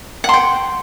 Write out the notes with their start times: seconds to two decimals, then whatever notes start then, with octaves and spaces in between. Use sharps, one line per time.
0.24 F#5
0.29 C6
0.34 G5